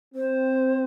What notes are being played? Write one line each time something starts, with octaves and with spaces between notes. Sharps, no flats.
C4 C5